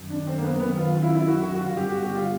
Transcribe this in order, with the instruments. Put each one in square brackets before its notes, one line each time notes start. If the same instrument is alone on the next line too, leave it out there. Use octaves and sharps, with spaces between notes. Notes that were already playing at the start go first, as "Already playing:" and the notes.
Already playing: [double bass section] F#2 D#3 F#3
[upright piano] D4
C4
A#3
B3
B3
F4
F4
E4
E4
F#4
F#4
F#4
F4
[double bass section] G2 D3 G3 B3 [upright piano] G4
[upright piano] F#4
G4
F4